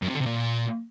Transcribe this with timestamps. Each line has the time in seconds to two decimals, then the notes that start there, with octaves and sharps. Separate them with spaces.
0.02 F#2
0.08 C3
0.14 D3
0.20 C3
0.26 A#2